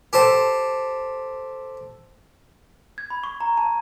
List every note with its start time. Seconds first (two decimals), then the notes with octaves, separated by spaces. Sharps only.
0.13 G4 A4 C5
2.98 G#6
3.10 B5
3.24 C#6
3.41 A#5
3.57 A5